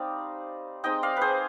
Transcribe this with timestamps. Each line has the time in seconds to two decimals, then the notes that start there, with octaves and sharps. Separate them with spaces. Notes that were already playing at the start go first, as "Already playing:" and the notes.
Already playing: G3 C4 D#4 D5 F5
0.84 G#3 C4 D#4 D#5 G5
1.03 D5 F5
1.17 G#4 B4 C5